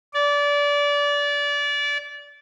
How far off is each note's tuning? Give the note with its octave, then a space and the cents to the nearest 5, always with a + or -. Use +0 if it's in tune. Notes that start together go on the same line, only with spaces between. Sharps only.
D5 -25